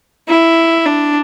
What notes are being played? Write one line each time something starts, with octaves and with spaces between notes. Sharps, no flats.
E4
D4